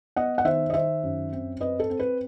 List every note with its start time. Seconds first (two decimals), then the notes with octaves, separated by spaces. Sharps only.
0.16 B3 D#5 F#5
0.38 F#5
0.45 D#3 C5 E5
0.70 D#5
0.74 D#3 C5 E5
1.03 F#2
1.32 C4
1.60 C4 B4 D#5
1.80 A4
1.90 C4
2.00 B4